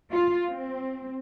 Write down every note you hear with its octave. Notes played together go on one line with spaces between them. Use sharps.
F4
C4